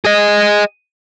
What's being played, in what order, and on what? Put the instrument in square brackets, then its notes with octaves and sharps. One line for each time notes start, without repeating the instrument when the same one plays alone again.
[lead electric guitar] G#4 D#5